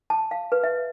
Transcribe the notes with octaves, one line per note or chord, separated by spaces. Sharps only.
A5
F5
B4
E5